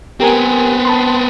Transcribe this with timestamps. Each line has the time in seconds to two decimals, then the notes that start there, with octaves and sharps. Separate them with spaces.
0.20 B3 C4 G4 A#4 G#5
0.85 A5 B5 C6